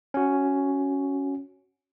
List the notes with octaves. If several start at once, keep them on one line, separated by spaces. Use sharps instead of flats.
C#4 F#4